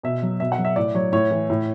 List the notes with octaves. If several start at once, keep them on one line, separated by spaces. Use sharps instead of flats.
B2 E5
F#3
B2 E5
F#5
F#3
E5
A2 D5
F#3 C#5
A2 C#5
E3
A2